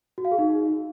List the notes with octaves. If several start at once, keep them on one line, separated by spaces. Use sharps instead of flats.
F#4
F5
G#4
D#4